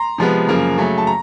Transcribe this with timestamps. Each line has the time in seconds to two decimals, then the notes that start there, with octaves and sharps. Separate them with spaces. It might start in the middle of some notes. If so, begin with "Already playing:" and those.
Already playing: A#5 C6
0.18 C3 F3 G#3 B3
0.48 F#2 C#3 F3 A#3
0.78 C#3 F#3 A3
0.98 A5
1.07 A#5